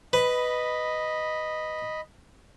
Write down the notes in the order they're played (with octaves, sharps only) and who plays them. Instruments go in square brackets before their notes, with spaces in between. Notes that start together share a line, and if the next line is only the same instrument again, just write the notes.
[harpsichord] B4 [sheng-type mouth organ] D#5 B5